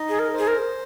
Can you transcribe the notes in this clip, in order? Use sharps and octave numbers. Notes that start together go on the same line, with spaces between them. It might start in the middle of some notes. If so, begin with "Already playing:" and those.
Already playing: D#4 D#5
G#4
A#4
C5
G#4
A#4